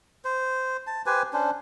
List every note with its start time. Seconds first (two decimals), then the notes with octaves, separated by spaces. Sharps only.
0.25 C5
0.87 A5
1.06 G4 B4 C5 G#5
1.33 C#4 D4 C5